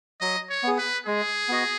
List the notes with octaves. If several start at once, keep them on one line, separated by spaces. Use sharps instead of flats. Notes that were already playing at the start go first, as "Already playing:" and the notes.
F#3 D#5
C#5
B3 G#4
B4
G#3 G#4
B3 F#4 D#5